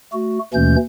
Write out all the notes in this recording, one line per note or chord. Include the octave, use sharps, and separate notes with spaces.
A3 F#4
D#2 B2 E3 A3 C#4 G6